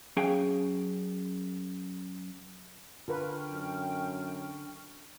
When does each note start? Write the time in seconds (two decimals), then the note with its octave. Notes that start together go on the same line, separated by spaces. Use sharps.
0.17 F#2 C#4 G#4 F5 G5 G#5
3.08 D3 F4 A#4 B4 G5 C#6 F6
3.50 F#2